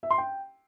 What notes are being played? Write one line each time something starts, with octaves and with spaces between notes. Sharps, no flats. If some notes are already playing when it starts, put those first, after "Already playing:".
E5
C6
G5